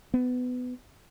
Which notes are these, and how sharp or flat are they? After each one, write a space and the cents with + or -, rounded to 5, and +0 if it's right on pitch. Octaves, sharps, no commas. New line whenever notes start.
B3 +20